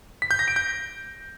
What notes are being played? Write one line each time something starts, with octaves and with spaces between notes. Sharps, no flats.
B6
G6
A#6
D7
G6